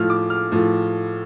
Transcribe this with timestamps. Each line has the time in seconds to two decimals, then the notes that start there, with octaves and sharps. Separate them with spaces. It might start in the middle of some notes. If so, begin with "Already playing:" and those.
Already playing: A2 F3 F6
0.10 D6
0.30 F6
0.52 A2 F3